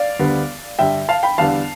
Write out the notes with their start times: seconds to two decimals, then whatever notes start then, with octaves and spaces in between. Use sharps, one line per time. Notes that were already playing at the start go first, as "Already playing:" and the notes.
Already playing: D5 F5
0.19 D2 D3 G3 B3
0.78 G2 D3 G3 E5 G5
1.09 F5 A5
1.23 G5 B5
1.38 E2 D3 G3 B3 F5 A5